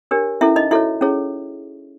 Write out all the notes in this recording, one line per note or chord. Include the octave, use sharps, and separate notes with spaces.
D4 G4 A#4 C#5
C#4 E4 A4 E5
D#4 D#5
E4 F#4 A4 C#5 E5
C#4 E4 G#4 C#5